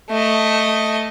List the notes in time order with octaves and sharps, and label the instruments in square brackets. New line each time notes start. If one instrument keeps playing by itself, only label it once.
[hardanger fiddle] A3 D#5